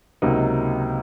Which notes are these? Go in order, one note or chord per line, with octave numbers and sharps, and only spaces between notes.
C#2 C3 F#3 A#3 D#4